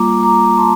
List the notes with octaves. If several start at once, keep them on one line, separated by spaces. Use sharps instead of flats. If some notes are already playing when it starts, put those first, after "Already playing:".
Already playing: G3 A#3 F4 A#5 D6
A#5 D6
A5 C6